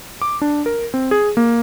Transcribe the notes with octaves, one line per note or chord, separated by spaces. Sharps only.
D6
D4
A#4
C4
G#4
A#3